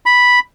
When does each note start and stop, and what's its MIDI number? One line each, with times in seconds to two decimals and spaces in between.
0.06 0.39 83